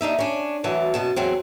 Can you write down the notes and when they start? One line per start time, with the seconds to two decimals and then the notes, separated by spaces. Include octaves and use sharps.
0.01 D#2 D4 D#4 E5
0.19 C#4 D4
0.64 D2 E3 F#3 A5
0.94 F#2 B2 A5
1.16 E2 F#3 C4